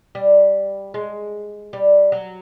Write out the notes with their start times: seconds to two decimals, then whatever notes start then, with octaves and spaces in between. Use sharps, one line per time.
0.15 G3
0.94 G#3
1.73 G3
2.12 F#3